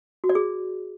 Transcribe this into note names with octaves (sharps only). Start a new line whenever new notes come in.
F#4
D5
G#4